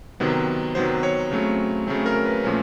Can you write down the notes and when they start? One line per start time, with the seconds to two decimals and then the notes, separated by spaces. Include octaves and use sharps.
0.20 C3 D#3 F#3 B3
0.75 C3 D#3 F#3 B3 C5
1.03 C#5
1.31 C#3 F#3 A3 C4
1.87 C#3 F#3 A3 C4
2.06 A#4
2.25 B4
2.44 A#2 F3 A3 C#4